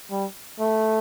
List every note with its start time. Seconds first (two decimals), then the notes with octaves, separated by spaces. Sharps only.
0.11 G3
0.60 A3